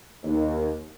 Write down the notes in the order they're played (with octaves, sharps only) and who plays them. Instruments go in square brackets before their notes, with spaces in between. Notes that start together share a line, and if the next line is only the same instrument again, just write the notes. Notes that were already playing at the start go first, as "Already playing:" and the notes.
[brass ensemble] D#2